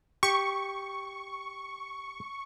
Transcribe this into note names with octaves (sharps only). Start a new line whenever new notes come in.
G4 C#6